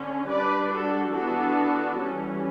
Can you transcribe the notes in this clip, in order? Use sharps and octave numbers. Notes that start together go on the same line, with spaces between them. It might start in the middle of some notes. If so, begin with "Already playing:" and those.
Already playing: D3 C#4
G3 D4 B4 D5
F#4 A4
E3 B3 D4 F#4 A4
E3 G3 C#4